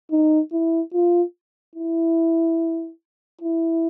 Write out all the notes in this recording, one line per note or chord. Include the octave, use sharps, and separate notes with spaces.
D#4
E4
F4
E4
E4